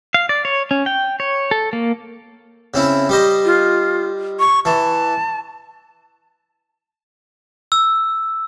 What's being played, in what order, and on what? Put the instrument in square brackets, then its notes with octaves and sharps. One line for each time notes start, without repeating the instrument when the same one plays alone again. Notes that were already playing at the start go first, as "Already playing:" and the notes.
[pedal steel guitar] F5
D5
C#5
C#4
G5
C#5
A4
A#3
[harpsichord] C#3 C4 E4
G3 C5 D#5
[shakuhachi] F4
C#6
[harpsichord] E3 [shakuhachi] A5
[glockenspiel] E6